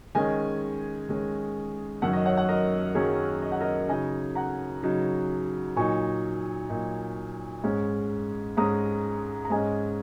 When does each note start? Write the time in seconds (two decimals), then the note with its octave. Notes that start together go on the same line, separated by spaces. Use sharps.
0.15 D#3 G#3 C#4 D#5 G#5
1.09 D#3 G#3 C#4
2.02 F#2 D#3 F#3 C#4 F#5
2.13 D#5
2.26 C#5 F#5
2.37 F#5
2.49 A#4 D#5
2.95 F#2 D#3 F#3 C#4 G#4 C#5
3.42 D#5
3.52 F#5
3.60 A#4 D#5
3.89 C#3 F#3 D#4 D#5 G#5
4.35 F#5 A#5
4.83 C#3 F#3 D#4
5.76 A#2 F#3 D#4 G#5 C#6
6.70 A#2 F#3 D#4
7.64 G#2 G#3 C#4
8.57 G#2 G#3 C#4 A#5 D#6
9.45 A#5
9.50 G#2 G#3 C#4 D#5 G#5